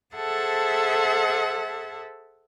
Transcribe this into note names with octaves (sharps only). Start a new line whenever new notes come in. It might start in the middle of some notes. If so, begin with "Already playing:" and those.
G#4 A4 C5 E5 F#5 A5